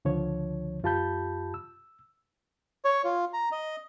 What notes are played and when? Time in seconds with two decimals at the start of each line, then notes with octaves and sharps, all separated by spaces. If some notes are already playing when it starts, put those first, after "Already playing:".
0.05 C#2 D3 F3 C#5
0.83 F#2 F4 G4 A5 B5 G6
1.54 E6
2.85 C#5
3.05 F4
3.33 A#5
3.52 D#5